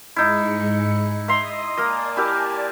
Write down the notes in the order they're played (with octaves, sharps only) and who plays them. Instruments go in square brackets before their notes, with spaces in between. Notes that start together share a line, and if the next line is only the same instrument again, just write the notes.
[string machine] G#2 G#3 C#7 [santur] D#4 E4
[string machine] D#5 D#6 [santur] E5 A#5 C6
[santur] A#3 A#4 D#5 [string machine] D5 G#5 A5
[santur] E4 G4 A#4